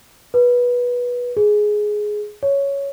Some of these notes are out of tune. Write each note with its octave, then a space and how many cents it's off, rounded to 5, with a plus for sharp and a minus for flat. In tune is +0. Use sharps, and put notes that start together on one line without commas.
B4 -15
G#4 +10
C#5 +5